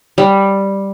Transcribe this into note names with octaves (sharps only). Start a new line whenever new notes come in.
G3